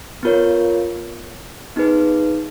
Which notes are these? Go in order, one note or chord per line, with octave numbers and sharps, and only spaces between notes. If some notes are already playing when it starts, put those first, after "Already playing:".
B3 F4 A#4 C#5
B3 D#4 G#4 B4